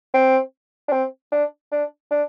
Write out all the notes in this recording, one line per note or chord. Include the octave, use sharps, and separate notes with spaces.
C4
D4
C4
D4
D4
D4